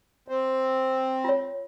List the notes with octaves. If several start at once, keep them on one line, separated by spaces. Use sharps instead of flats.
C4
F4 C#5